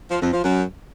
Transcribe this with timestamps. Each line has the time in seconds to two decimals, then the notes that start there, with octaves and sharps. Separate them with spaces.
0.10 F3
0.22 F2
0.33 F3
0.44 F#2